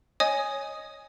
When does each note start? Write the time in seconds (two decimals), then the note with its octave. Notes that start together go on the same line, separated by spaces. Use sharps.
0.20 C#5 D#5 G#5 D#6